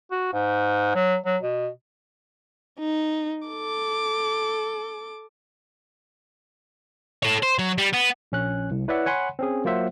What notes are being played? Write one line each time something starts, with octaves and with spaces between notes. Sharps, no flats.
F#4
G#2
F#3
F#3
B2
D#4
A4 D6
A4 C#5
C5
F#3
G3
B3
A#1 C#4 F#6
C2
E4 B4 C#5 D5 E5 F#5
C#5 F#5 G#5 B5 C6
C4 C#4 G#4
F#3 A#3 F4 C5 E5 F#5